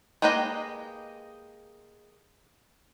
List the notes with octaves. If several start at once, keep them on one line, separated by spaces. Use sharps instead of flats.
G#3 A#3 G4 B4 D#5